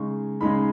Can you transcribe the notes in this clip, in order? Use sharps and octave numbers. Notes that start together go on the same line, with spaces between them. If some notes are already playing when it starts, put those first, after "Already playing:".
Already playing: C#3 G#3 D#4 C#6
C#3 G#3 D#4 B5